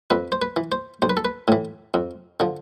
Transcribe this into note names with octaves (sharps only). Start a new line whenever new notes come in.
F2 B4
C5
B4
E3
C5
B1 C5
B4
A4
B4
A2 E3
F2
D3 F3